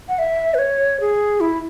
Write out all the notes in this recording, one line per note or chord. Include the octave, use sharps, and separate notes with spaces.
F#5
E5
B4
C#5
G#4
E4